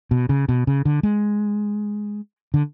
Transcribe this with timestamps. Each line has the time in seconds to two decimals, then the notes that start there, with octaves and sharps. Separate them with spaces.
0.11 B2
0.29 C#3
0.49 B2
0.67 C#3
0.85 D3
1.03 G#3
2.54 D3